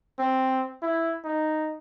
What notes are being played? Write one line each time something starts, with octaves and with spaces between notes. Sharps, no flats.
C4
E4
D#4